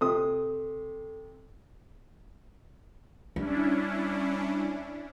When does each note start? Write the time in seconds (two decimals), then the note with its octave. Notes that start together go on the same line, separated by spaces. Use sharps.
0.01 C3 A4 D#6
3.36 G3 C#4 D4 E4